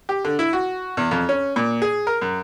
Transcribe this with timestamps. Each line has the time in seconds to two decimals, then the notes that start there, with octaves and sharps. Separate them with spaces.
0.09 G4
0.25 D3
0.39 E4
0.53 F#4
0.97 E2
1.11 F2
1.29 C#4
1.56 A#2
1.82 G#4
2.07 A#4
2.22 F#2